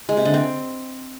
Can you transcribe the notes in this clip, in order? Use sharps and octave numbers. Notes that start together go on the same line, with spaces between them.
G#3
C3
D3
C4